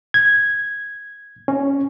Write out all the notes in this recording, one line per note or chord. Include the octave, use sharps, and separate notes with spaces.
G#6
C#4